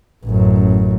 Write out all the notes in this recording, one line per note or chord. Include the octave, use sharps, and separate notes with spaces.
A1 F#2